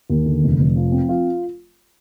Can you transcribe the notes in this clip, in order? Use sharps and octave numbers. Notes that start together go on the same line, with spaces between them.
D#2
D3
F1
F1
F3
C4
F4